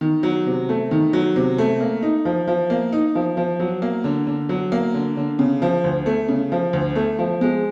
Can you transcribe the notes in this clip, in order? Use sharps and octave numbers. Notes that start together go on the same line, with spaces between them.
D#3
F#3
C3
A3
D#3
F#3
C3
A3
A#3
D#4
F3
F3
A#3
D#4
F3
F3
F#3
A#3
D3
D3
F#3
A#3
D3
D3
C#3
F3
D2
A3
C#3
F3
D2
A3
F3
G#3